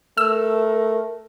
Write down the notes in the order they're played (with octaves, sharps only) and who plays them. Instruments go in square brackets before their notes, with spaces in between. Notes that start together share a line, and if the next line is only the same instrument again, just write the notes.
[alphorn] A3 [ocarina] A#4 [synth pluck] E6